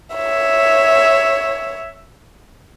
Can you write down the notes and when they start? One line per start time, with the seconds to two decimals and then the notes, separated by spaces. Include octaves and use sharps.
0.14 C#5 E5